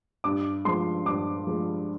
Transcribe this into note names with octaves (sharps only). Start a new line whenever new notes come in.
G2 D6
F3 G#3 C6
G2 D6
F3 G#3